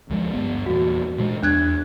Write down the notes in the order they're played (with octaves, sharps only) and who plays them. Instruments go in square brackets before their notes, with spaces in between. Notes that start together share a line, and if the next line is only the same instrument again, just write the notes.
[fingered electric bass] D2 F3 G#3
G1 B3
[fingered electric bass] E2 A#2 [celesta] F#4
[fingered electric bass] A#2 G#3
[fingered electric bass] E2 [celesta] D4 F#6 G#6